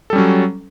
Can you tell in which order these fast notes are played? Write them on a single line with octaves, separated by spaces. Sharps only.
A4 G3 C#4 F#3